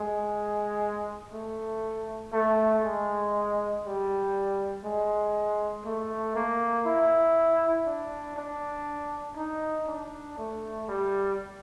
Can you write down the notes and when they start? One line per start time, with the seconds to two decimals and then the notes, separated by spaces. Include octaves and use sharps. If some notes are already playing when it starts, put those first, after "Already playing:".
Already playing: G#3
1.33 A3
2.33 A3
2.84 G#3
3.84 G3
4.84 G#3
5.85 A3
6.35 A#3
6.86 E4
7.86 D4
8.37 D4
9.37 D#4
9.88 D4
10.38 A3
10.88 G3